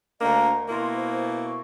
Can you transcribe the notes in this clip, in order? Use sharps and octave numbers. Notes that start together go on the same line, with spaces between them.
D2 A#3 D4 D#5 F5 A#5
B2 A#3 E4 C6
C5
C#6